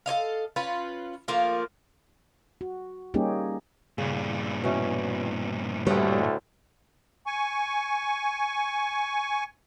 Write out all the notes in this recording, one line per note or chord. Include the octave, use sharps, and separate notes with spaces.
A4 C#5 D#5 F5
C#4 F4 B4
F3 A3 A#3 F4
F#4
G3 A#3 C#4 D#4 G4 G#4
G2 A#2 C#3
B2 E3 C#4
D2 A2 G3 B4 C#5 D#5
G#5 C#6